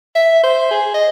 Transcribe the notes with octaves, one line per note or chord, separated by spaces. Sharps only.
E5
C5
G#4
D#5